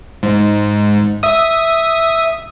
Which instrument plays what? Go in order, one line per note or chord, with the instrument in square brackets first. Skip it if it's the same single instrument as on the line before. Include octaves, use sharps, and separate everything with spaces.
[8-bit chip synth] G#2
E5 D#6